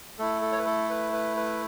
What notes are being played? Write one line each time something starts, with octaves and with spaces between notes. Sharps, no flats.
A3 E4 A4
A4
C#5
B4
A4
B4
B4
B4